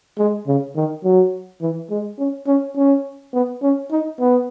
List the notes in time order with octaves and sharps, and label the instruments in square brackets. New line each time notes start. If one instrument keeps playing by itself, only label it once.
[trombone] G#3
C#3
D#3
F#3
E3
G#3
C#4
C#4
C#4
B3
C#4
D#4
B3